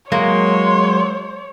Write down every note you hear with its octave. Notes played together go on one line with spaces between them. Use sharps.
F#3 G#3 A#3 C#5 C6